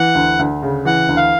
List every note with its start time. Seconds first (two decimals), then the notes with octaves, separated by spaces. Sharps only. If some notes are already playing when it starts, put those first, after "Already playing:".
Already playing: E3 F#5
0.15 D2
0.39 D2
0.62 C#3
0.85 E3 F#5
1.09 D2
1.17 F5